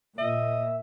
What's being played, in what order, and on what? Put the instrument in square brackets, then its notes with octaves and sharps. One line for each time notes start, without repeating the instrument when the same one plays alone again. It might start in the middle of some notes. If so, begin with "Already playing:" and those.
[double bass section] A#2 [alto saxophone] D#5 [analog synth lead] E5